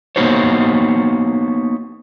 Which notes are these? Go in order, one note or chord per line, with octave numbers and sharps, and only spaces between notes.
A#3 B3 D#4 F#4 C5 C#5